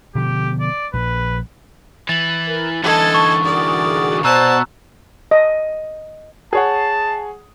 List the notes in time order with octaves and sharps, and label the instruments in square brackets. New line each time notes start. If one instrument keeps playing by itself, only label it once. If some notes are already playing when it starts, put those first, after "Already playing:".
[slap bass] B2 D3 F3 [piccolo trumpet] G4
[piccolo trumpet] D5
[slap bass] A#1 [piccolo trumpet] B4
[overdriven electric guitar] E3 [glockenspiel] A6 F#7
[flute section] A#4
[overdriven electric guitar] D3 E3 [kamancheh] A4 D#5 [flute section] A5 G#6
[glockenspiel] C#6
[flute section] F#4 G#4 D#6 [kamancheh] A#4 D5
[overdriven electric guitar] B2 [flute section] C5 D5 F#5 [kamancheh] A5 [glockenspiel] A#5 E6 F#6
[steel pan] D#5
[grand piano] G#4 C#5 F#5 [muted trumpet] A5